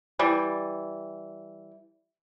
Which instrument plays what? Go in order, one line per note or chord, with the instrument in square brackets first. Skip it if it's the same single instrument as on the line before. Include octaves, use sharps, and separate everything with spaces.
[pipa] E3 G3